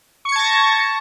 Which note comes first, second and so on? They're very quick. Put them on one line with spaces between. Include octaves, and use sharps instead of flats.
C#6 C#7 G#6 A5 A#6